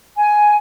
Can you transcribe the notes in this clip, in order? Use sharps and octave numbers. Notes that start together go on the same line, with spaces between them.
G#5